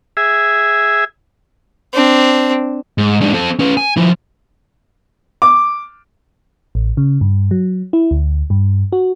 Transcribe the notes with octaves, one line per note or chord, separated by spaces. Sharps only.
G#4 E5
C4 D4
G#2
G#2 D4
C4 A4
C#4 B4
G#5
F3 E4
D6
A1
C#3
G2
F#3
E4
D2
G2
F#4